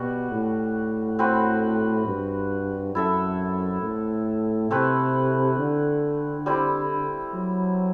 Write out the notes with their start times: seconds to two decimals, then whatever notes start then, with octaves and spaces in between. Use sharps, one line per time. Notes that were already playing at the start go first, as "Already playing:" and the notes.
Already playing: B2 G3 F#4
0.32 A2
1.19 C4 F#4 B4
2.07 G2
2.95 F#2 E4 A4 E5
3.82 A2
4.71 C3 A3 C4 E4 B4
5.59 D3
6.46 G3 C4 E4
7.34 F#3